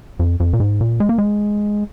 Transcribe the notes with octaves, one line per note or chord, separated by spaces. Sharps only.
F2
F2
A#2
G#2
A#2
G#3
A#3
G#3